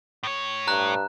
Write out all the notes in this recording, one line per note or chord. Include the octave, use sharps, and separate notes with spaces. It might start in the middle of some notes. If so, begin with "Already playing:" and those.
A2 C#5
G2 A#5 F#6